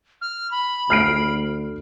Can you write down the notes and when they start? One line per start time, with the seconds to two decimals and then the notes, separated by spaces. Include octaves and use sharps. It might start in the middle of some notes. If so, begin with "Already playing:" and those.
0.21 F6
0.51 B5
0.90 D2 F6 C7 D7